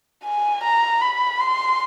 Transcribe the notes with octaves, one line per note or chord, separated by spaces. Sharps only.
G#5
A#5
B5
C6